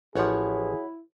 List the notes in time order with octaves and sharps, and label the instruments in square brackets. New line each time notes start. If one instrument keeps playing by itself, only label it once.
[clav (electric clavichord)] A1 F3 [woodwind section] E4 [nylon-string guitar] F#4 C#5 F#5 [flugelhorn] G#4